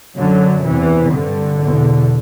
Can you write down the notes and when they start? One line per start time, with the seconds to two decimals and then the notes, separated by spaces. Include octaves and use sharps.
0.17 F#2 D3 F#3
0.64 E2 C3 E3
1.12 G2 D3
1.61 E2 B2